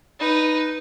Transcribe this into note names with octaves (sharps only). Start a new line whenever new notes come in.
D#4 B4